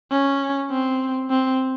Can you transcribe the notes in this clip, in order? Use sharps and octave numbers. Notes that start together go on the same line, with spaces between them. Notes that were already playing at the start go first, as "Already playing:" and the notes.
C#4
C4
C4